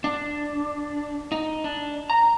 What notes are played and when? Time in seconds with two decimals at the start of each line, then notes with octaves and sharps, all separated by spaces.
0.04 D4
1.32 D#4
1.64 D4
2.10 A#5